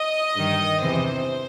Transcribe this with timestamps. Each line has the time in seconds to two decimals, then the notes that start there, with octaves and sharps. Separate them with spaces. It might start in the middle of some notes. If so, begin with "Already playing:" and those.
Already playing: D#5
0.35 G2 D#3
0.81 E2 C3 E3 C5